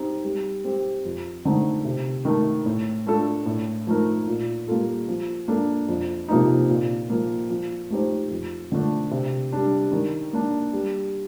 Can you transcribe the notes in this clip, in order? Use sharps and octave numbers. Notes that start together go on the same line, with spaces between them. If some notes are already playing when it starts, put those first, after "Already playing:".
Already playing: G3 C4 D#4
G3
C4 G4
F2
D3 A3 C4 D#4
C3
D#3 A3
A2
A3 D4 F4 A4
A2
F3 A3 D#4 A#4
A#2
G3 A#3 F4 A4
F3
A#3 D4 A4
F2
C3 F3 A#3 D#4
A#2
F3 A#3
F3
A3 D#4 G4 C5
F2
D3 F3 A3 D4
C3
G3 D4
D#3
A#3 D4
G3